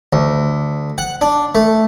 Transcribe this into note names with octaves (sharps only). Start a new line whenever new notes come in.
D2
F#5
D4
A3